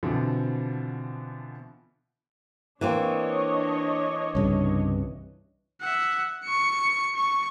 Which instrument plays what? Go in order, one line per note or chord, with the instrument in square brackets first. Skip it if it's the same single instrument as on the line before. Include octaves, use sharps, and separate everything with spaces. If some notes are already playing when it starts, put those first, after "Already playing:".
[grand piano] B2 D3 E3 F3 B3 C4
[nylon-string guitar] E3 A#3 C4 [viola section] D4 C#5 D#5
[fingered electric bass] C2 G2 C#3
[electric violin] E5 F#5
C#6 C#7
C#6